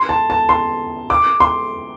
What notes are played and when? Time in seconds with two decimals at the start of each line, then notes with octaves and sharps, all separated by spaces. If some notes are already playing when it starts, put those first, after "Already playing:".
Already playing: C6
0.09 A5
0.30 A5
0.49 C6
1.10 D6
1.40 C6